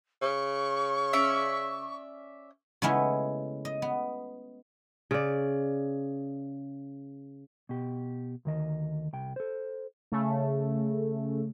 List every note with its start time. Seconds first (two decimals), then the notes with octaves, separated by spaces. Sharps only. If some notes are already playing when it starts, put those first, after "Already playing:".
0.22 C#3 C#6
1.13 C#4 D5 E5
2.82 C#3 G#3 A3 B3 C#4 E4
3.65 D#5
3.82 B3
5.11 C#3 D5
7.69 B2 G4
8.45 D2 D#3 D#5
9.13 C2 G5
9.36 A4 C5
10.12 C#3 A3